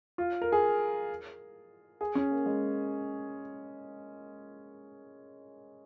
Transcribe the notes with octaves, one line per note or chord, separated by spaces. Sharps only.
F4
A#4
G#4
G#4
C#4
A#3
G#3